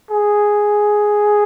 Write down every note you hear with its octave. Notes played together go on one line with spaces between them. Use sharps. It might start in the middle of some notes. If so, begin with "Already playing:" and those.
G#4